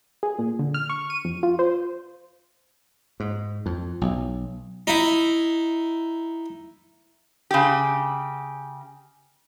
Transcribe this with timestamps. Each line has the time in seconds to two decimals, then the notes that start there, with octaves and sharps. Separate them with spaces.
0.23 G#4
0.39 A#2
0.59 D3
0.74 F6
0.90 C#6
1.10 D#7
1.25 F2
1.43 F4
1.59 C5
3.20 G#2
3.66 F2
4.01 B1
4.87 D#4 E4
7.51 C#3 G4